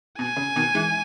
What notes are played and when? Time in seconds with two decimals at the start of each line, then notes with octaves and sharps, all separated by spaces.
0.19 B2 G#5
0.37 C#3
0.56 B2 D#3
0.75 E3 G#3